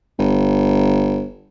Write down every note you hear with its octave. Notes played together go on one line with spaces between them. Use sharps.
G1